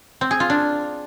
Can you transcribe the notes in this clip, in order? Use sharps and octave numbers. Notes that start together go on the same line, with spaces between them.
C4
G#4
F4
D4